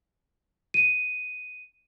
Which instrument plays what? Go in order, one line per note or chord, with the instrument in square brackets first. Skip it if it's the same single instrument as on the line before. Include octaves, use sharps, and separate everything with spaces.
[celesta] D#7